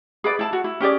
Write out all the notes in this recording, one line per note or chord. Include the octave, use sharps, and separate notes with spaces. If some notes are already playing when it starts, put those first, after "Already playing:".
G#4 B4 D5
E4 A5
F#4
E4
C#4 G4 G#4 D5